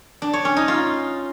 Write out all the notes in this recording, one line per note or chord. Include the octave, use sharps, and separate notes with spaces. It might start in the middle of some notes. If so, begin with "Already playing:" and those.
D4
C#5
C#4
D#4
F4